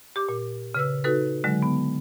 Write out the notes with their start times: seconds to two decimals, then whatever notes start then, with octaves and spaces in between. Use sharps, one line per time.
0.16 G4 D6
0.29 A#2
0.75 C#3 B4 E6
1.04 D#4 F#4 A4 B4
1.44 D3 F#3 G#3
1.62 B3